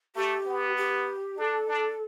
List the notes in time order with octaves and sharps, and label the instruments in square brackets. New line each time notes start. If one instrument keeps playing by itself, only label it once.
[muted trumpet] A3 [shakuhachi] G4
[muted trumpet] B3
[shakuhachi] G4
[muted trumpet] D4 [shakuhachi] A4
[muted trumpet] D4